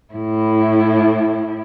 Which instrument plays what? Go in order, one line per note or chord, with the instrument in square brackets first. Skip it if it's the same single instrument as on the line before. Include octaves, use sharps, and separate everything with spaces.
[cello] A2 E4